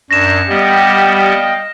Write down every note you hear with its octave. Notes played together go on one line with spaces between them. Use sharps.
F#2 D4 C#6 A#6 E7
G3 B3 G4 D#5 F5 G5